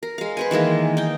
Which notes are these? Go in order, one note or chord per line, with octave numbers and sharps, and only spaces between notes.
A#4
G#3 F5
B4 C5 G#5
D#3 E3 G#3 A#3
D#4 G5